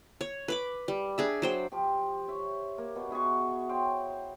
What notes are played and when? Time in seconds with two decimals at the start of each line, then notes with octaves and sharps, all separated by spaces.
0.21 C#5
0.48 B4 B5 D6
0.88 G3
1.18 D4 G#4 E5
1.42 F#3 C5 G5
1.72 F3 G4
2.28 C#5 E5
2.78 A#3
2.96 B2
3.11 E4 G#4 F#5 C#6
3.69 C5 C#5 G5